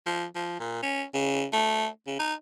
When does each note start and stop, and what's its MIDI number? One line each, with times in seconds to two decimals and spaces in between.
0.06 0.25 53
0.35 0.57 53
0.60 0.81 46
0.82 1.04 61
1.14 1.45 49
1.53 1.87 57
2.07 2.18 49
2.19 2.34 63